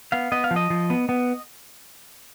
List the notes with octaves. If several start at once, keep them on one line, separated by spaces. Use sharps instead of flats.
B3 F5
B3 D#5
F5
F3
D#5
F3
B3
B3